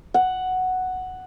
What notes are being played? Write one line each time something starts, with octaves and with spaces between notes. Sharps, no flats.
F#5